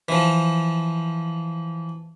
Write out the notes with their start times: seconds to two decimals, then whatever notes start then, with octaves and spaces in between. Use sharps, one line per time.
0.09 E3 F3